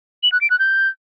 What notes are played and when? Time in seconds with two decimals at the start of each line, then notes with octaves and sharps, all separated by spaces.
0.23 F#7
0.32 F#6
0.41 D7
0.50 F#6
0.59 G6